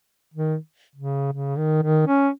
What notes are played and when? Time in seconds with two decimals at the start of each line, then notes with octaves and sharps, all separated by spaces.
0.34 D#3
0.95 C#3
1.33 C#3
1.57 D#3
1.82 D#3
2.07 C#4